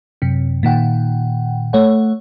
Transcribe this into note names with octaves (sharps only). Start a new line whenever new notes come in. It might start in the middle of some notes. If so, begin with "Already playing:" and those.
F#2 C3
A#2 D#3 F#5 G5
A3 C#5 F#5